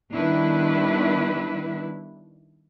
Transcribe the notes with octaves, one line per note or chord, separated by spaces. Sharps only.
D#3 G3 B3 D4 E4 B4